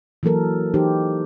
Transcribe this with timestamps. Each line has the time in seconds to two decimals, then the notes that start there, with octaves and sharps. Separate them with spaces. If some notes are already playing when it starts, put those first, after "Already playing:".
0.23 E3 F#3 A#3 A4 A#4
0.74 E3 D#4 G4 C5